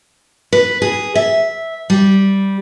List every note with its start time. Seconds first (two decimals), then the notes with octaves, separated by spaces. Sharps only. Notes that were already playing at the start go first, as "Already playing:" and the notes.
0.52 B4
0.82 G#4
1.15 E5
1.90 G3